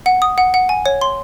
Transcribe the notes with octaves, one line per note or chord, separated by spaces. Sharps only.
F#5
D#6
F#5
F#5
G#5
C#5
C6